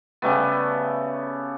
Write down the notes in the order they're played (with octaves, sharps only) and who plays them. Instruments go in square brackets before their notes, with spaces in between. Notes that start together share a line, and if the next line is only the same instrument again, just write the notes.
[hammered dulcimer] C#3 G3 A3 B3